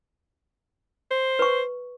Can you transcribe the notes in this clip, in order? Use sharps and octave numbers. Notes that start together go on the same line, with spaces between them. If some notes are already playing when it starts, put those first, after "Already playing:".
C5
B4 C#6